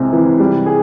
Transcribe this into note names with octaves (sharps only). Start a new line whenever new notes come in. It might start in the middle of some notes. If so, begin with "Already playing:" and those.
Already playing: C2 C3 G#3
E3
G3
G#4